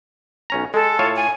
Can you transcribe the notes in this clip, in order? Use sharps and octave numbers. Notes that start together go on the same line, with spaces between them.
B1 C#4 A#5
G#3 A4
A2 F4 C#5
G#5